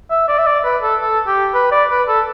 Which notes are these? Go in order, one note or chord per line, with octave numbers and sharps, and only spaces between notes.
E5
D5
E5
D5
B4
A4
A4
G4
B4
D5
B4
A4